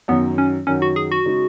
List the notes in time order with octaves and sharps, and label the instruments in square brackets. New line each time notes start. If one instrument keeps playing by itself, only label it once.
[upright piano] F#2 D#3 F#3 [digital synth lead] B3
[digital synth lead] C#4
[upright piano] F#2 D#3 F#3 [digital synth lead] C#4
[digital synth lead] F#4
G#4
F#4
[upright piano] C#3 G#3 D#4